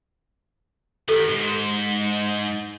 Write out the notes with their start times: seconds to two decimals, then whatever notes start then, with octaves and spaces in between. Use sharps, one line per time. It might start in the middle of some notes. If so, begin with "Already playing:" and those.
1.09 D#3 B3 G4 A4
1.29 G#2